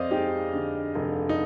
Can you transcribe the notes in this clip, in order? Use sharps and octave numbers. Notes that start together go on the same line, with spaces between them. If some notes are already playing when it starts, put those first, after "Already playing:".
Already playing: F2 C5 D5 D#5 F5
G#3 D#4 G4
D3
F1
D#4